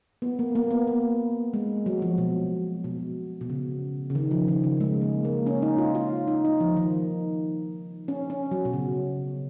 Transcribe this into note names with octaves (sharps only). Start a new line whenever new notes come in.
B3
A#3
A#3
B3
A#3
G#3
F#3
F3
B2
B2
B2
C#3
C#3
D#3
F3
D#3
C#3
G#3
A#3
A#3
C#4
D#4
F4
F4
D#4
D#4
F3
D#3
C#4
C#4
F#3
B2
C#3